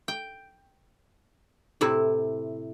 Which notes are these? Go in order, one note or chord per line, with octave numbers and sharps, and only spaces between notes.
G5
A2 C3 E4